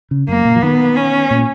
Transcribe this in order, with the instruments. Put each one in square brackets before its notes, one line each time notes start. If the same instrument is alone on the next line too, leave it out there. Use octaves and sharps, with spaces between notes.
[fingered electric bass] C#3
[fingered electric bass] F#2 [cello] A#3
[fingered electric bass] A#2
F3
[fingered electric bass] D#3 [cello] B3
[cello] C#4
[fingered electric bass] A#2